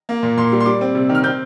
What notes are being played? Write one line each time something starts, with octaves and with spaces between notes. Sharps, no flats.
A#3
A#2
A#2 C6
G3
C6
G3 D6
C4
C3
D#3
F6
C4 G6